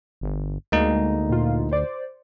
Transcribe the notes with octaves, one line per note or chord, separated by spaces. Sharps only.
G1
D2 G#3 A#3 D#4
A#2 F4
C5 D5